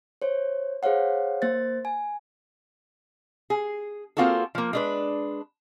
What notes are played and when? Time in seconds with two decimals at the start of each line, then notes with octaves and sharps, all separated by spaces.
0.22 C5 C#5
0.83 G#4 C5 C#5 F5 F#5
1.42 A#3 C5 A6
1.85 G#5
3.50 G#4
4.17 A#3 C4 F4 F#4 G#4 A4
4.55 F3 A#3
4.73 G#3 D4 B4